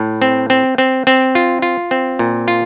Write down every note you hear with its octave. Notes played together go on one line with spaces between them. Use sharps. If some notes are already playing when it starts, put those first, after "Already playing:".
Already playing: A2
C4
C4
C4
C4
F4
F4
C4
A#2
F4